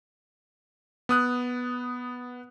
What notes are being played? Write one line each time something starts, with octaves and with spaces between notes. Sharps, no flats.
B3 D#6 F#6